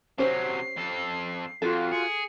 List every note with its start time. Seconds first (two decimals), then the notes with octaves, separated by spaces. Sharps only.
0.18 C3 F#3 C#4 G4 C5 C7
0.76 F2 A4
1.62 F2 F4 F#4 A4
1.92 G#4 C#7